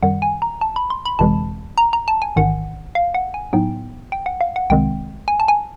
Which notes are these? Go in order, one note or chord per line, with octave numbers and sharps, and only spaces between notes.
F#2 D#3 G3 F#5
G#5
A#5
A5
B5
C6
B5
G1 F2 C3 E3 G#3 A5
A#5
A#5
A5
G#5
A1 G#2 D#3 F#5
F5
F#5
G#5
A2 F#3 B3 D#4 G5
G5
F#5
F5
F#5
C2 C3 D#3 G#3 C4 G5
G#5
A5
G#5